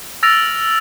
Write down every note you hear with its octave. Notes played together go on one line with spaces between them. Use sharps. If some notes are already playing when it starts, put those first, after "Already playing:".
E6 F6 A6 A#6 D7 F7